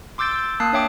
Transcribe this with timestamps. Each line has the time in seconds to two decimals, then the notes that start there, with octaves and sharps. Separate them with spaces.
0.18 C6 D6 E6 G6 A6 D7
0.32 E6 G6
0.60 A#3 A5 D#6 F#6 C7
0.73 D4 C#5 E5 G5 D6